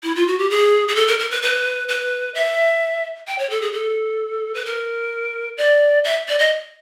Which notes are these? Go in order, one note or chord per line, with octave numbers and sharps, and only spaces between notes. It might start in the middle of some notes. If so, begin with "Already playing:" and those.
E4
F4
F#4
G4
G#4
G#4
A4
A#4
A#4
B4
B4
B4
E5
G5
C#5
A4
G#4
A4
B4
A#4
D5
E5
D5
D#5